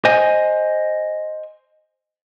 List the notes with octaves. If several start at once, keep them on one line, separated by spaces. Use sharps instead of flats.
C5 D#5 G#5